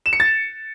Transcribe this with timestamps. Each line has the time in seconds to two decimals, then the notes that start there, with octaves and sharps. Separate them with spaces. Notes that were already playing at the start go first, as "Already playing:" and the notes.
0.06 E7
0.13 C#7
0.20 A6